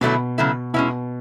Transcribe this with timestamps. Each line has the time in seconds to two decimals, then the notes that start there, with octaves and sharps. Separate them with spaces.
0.01 B2 D3 F#3 A3 E4
0.38 C#3 F#3 A3 E4
0.74 B2 G#3 C#4 E4